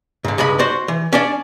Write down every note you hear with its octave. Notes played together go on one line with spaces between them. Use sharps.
G#2 D3
C#2 G2 G#3 B5
F#4 C5 D5
E3
C#4 D4 D5